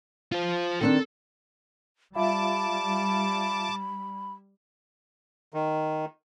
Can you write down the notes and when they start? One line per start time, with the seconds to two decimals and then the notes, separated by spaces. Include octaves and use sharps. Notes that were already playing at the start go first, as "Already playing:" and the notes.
0.32 F4 C5
0.81 D#3 C4 D4 A4
2.15 G3 F4 E5 F5 A5 B5 D6
5.54 D#3